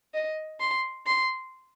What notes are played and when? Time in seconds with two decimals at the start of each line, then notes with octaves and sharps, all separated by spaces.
0.14 D#5
0.60 C6
1.06 C6